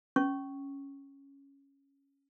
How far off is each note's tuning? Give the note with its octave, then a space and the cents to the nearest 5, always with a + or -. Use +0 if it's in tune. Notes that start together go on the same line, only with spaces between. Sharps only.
C#4 +0 C#6 +0